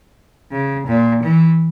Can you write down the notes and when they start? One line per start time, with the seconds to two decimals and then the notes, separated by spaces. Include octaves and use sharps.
0.52 C#3
0.87 A#2
1.23 E3